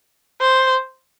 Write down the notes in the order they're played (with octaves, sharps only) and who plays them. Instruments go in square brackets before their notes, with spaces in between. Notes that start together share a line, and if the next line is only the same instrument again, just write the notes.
[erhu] C5